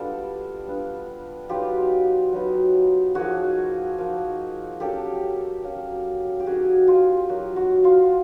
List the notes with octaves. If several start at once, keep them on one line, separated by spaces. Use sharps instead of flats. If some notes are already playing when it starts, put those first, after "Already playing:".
Already playing: G3 B3 D4 F4 G4 A4
G3 B3 D4 F4
F#3 B3 D#4 F4 G4
F#3 B3 D#4
F3 A#3 D#4 F#4 G#4
F3 A#3 D#4
F#3 A#3 C#4 G4 A4
F#3 A#3 C#4
G4
F#3 A#3 D#4 F#4 G#4
F4 G4
F#3 A#3 D#4 F#4
F#4
F4